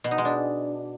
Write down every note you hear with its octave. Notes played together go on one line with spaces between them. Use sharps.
B2
D#4
G#3
D4